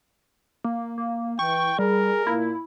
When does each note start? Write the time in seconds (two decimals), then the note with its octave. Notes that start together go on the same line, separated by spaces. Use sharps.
0.64 A#3
0.98 A#3
1.39 E3 G5 C#6
1.79 G3 G#4 A#4
2.27 A#2 A#3 E4